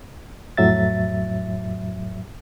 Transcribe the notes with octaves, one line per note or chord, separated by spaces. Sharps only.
F2 A2 F#3 E5 A6